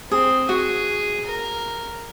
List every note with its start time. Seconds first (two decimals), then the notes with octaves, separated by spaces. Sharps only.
0.11 C4 G#4
0.49 F#4 G#4
1.25 A#4